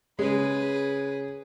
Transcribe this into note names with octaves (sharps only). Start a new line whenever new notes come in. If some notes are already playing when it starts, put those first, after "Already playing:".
C#3 G#3 G#4 B4